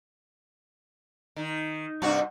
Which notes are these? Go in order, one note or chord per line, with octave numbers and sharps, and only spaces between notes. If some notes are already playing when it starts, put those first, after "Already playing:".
D#3
G2 C3 F#4